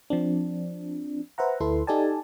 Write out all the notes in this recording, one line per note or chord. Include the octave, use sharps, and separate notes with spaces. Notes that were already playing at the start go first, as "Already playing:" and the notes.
F3 C4 D4
B4 C5 E5 F#5 A#5
D2 E4 A4 B4 C6
D#4 G4 A4 D5 G#5 A5